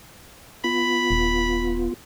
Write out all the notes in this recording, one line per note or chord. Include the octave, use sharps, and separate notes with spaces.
B3 F4 B5
D#1